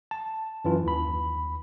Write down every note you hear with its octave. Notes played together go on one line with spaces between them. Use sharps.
A5
F#2 E3 F4
D#2 B5